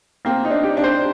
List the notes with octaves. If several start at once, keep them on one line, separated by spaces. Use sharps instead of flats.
A#3 C4
D#4
D4
G4
D4
C5